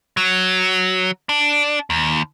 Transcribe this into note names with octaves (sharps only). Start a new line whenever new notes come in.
F#3
D4
D#2